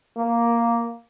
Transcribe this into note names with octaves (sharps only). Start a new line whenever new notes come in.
A#3